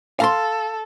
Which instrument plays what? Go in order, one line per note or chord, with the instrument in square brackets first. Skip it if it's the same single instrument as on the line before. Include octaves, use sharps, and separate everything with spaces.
[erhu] A4 [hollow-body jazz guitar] F5 A#5 C6